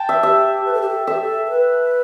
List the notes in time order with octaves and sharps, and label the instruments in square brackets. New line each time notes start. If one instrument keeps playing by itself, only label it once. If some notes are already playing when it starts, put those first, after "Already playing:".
Already playing: [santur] G5 A5
E5
[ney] G4 [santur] E5
[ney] B4
A4
G4
A4
[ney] A4 [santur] E5
[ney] G4
A4
A4
B4